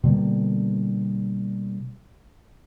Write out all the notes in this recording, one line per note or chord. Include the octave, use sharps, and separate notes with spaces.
B2 D3 G3 A#3